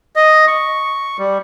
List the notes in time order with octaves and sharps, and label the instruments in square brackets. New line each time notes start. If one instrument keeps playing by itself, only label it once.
[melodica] D#5
C#6
G3